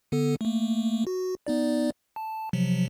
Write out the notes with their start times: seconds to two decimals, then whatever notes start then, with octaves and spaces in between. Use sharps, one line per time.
0.12 D3 B3 A4
0.41 A3 A#3
1.07 F#4
1.47 B3 D#4 D5
2.16 A5
2.53 C3 F3 F#3